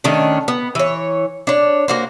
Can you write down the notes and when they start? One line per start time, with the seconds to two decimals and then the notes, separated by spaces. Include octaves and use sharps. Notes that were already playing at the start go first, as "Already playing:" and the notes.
0.04 D#3 A3 C#4 D4
0.48 B3
0.75 E3 C#5
1.47 D4 C#5
1.88 A#3 F#4 C5